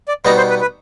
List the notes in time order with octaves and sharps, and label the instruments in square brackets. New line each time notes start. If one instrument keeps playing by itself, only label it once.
[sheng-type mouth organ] D5
[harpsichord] B2 G3 B3 D#4 [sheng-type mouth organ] D#5
[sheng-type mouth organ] C5
B4
B4